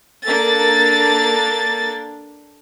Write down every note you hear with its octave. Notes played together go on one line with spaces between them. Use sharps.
A#3 D4 A4 A6